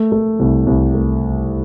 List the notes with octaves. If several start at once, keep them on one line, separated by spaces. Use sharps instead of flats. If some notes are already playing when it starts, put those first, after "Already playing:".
Already playing: A3
A3
C2
C2
A3